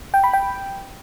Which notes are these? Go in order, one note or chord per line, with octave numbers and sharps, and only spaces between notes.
G5
B5
G5